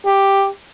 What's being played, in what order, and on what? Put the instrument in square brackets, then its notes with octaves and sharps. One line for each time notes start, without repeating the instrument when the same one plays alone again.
[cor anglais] G4